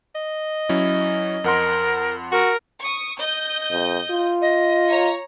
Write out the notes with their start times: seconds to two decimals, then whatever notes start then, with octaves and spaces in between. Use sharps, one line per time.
0.15 D#5
0.69 F#3 C#4 E4
1.44 F2 A#4 F#5 C6
2.32 F#4 A#4
2.80 C#6 D#6
3.19 D#5 G6
3.71 F2
4.11 F4
4.41 D#5
4.88 C#5 A#5